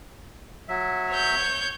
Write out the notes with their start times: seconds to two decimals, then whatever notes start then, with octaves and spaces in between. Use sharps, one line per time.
0.69 F#3 E5
1.11 C#5 G6